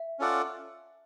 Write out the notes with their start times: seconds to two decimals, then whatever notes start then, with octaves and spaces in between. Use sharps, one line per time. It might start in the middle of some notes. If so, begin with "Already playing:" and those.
Already playing: E5
0.19 C#4 F4 A4 D5 F#5